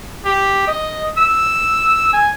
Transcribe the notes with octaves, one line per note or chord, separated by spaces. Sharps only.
G4
D#5
E6
G#5